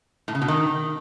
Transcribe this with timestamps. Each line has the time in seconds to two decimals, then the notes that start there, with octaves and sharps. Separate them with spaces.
0.28 A2
0.35 C#3
0.42 B2
0.48 D#3